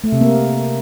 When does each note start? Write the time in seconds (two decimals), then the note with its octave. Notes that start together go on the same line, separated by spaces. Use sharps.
0.04 A3
0.12 C3
0.21 A#3